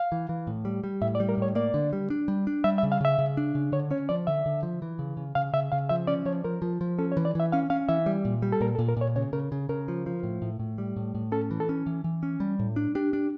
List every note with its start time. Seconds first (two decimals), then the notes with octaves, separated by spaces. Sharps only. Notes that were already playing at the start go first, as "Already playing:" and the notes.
Already playing: F5
0.12 E3
0.29 E3
0.47 A2
0.65 G3
0.84 G3
1.01 A2 E5
1.15 D5
1.20 G3
1.29 A#4
1.37 A2 C#5
1.55 A#3 D5
1.74 D3
1.93 G3
2.10 D4
2.28 G3
2.47 D4
2.64 G3 E5
2.78 E5
2.83 C#3
2.92 F5
3.01 C#3 E5
3.19 C#3
3.37 D4
3.55 C#3
3.72 D3 C#5
3.91 C#4 C#5
4.09 F3 D5
4.27 D3 E5
4.46 D3
4.63 F3
4.82 E3
4.99 C#3
5.17 C#3
5.35 C#3 F5
5.53 C#3 E5
5.72 C#3 F5
5.89 F3 E5
6.07 C#4 D5
6.25 F3 C#5
6.44 F3 A#4
6.62 F3
6.81 F3
6.99 C#4 A4
7.12 C#5
7.17 E3
7.25 D5
7.35 E3 E5
7.52 C#4 F5
7.70 C#4 F5
7.89 E3 E5
8.06 G3
8.25 A#2
8.42 G3
8.52 A4
8.61 A#2 A#4
8.75 A4
8.79 A#2
8.88 A#4
8.97 A#2 C#5
9.16 C#3 C#5
9.33 C#3 A#4
9.52 C#3
9.69 C#3 A#4
9.88 F3
10.06 F3
10.23 A2
10.42 A2
10.59 A2
10.78 G3
10.97 A2
11.15 A2
11.32 C#4 A4
11.51 E3
11.60 A4
11.69 C#4
11.87 E3
12.04 E3
12.23 C#4
12.40 G3
12.59 A2
12.76 D4
12.95 D4 G4
13.13 D4